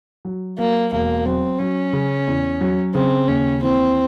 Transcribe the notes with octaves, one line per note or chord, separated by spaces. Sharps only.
F#3
F#3 A#3
E1 A#3
F#3 C4
F#3 C#4
C#3
E2
F#3
C#3 C4
D#2 C#4
E3 C4